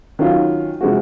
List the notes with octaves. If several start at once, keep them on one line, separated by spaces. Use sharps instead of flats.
D#3 F#3 C#4 F4
C3 F3 G#3 C4 F#4